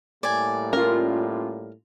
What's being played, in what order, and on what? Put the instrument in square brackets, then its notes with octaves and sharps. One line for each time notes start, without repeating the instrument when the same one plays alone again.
[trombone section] A2 G3 A#3 [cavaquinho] D5 G#5
[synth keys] C#4 F4 [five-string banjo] A#4